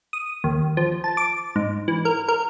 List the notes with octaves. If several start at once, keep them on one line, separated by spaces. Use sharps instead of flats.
D#6
D#2
F3
A5
D6
G#2
E3
A#4
A#4